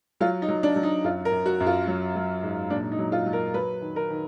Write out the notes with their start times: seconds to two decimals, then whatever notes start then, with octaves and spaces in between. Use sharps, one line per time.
0.20 F#3 F4
0.42 D#4
0.48 F#3
0.63 D4
0.76 F#3
0.83 D#4
1.04 F#2 F4
1.25 A#4
1.32 F#2
1.46 F#4
1.60 F#2
1.66 F4
1.87 F#3
2.16 F#3
2.43 G#2
2.70 A#2 D4
2.92 D#4
2.99 F#3
3.12 F4
3.26 F#3
3.33 A#4
3.54 F#3 B4
3.81 D#3
3.96 A#4
4.10 D#3